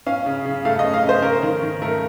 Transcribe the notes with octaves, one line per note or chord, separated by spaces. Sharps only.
C#4 F5
C#3
C#3
A3 F5
D#5
C#4
F5
C#3
C5
C#4 A#4
D#3
D#3
A3 A#4